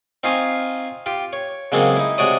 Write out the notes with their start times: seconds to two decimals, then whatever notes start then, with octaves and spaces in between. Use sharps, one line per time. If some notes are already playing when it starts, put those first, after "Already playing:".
0.24 C4 D#4 F4 F5 G#5 C#6
1.06 F4 G4
1.33 C#5
1.72 C#3 F#3 G#3 A#3 C4 A4
1.97 D#4 E4
2.18 C3 G#3 F#4 C#5 D5 D#6